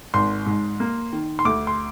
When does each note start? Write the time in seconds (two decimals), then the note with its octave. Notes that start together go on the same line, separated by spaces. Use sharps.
0.14 G#1 C6
0.46 G#2
0.80 A#3
1.13 D#3
1.39 C6
1.45 D2 D6
1.67 C6